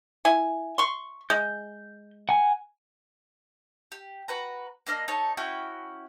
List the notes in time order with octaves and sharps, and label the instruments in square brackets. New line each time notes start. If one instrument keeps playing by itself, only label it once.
[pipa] E4 G#5
C6 C#6
[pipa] G#3 [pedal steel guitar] G6
[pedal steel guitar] F#5 G#5
[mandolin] G4
F#4 B4 A#5
A#3 D4 D#5 F6
D#4 A4 C#5 A5
C#4 E4 F#4 G5